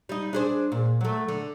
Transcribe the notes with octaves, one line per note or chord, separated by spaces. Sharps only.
G3 D#4
D4 G#4 C5
A#2
F#3 A3
D3